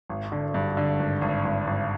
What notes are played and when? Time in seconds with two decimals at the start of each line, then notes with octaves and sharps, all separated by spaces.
0.09 G#1
0.32 D3
0.54 G2
0.77 D3
1.00 G#1
1.21 G#1
1.45 G#1
1.67 G#1